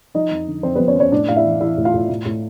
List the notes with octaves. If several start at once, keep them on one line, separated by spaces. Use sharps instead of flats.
F3 D#4 D#5
F2
D3
F2 C4 C5
B3 B4
F3
C#4 C#5
F2 C#4 C5 C#5
A2 D4 D5
A2 F5
E4 E5
E3
E3 E4 E5
A2
F4 F5
A2
A2
A2